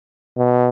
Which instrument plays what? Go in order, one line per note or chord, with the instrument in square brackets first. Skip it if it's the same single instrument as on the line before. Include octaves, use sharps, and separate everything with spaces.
[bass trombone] B2